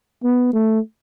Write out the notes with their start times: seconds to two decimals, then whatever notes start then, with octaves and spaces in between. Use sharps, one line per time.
0.23 B3
0.53 A3